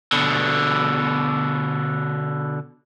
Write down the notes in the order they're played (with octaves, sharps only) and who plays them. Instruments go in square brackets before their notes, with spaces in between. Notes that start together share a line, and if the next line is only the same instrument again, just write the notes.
[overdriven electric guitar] B2 D3